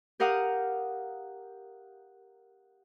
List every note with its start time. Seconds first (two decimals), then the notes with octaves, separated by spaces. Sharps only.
0.20 G4 A#4 F5 F#5 D#6